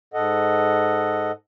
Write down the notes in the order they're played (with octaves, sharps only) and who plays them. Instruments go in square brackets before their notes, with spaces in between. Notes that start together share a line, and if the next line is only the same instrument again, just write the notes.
[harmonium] G#2 A4 D#5 F#5